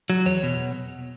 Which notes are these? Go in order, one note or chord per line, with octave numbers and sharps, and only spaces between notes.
F#3
E2 C#5
B2